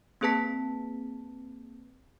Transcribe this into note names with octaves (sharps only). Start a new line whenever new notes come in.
A#3 C4 G#4 B4 A5 B6